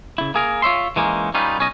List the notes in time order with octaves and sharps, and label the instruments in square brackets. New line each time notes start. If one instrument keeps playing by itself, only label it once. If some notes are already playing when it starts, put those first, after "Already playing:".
[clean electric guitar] C#3 E4
A#3 G#4 A#4
F4 C#5 E5 C6
E3 G#3 A#3 C#4 D#4
G3 C#4 D#4 F4 B4
B1 C#4 D#5